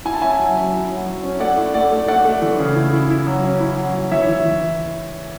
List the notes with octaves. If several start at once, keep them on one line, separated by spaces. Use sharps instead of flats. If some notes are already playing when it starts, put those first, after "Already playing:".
E4 G#5
A5
C#4 E5 G#5
F#3
F#3
E4
F#3
F#3
C#4
A3 D5 F#5
E4
A3 D5 F#5
A3
A3 D5 F#5
A3
E3
C#3
E4
E4
E4
F#3
C#4
E4
F#3
F#3
E3 C#5 E5
E3
E3